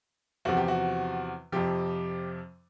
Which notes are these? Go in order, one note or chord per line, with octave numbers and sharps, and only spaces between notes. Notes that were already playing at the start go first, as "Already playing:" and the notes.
E2 C3 F3 F#4
G4
F#4
F2 C3 F3 G4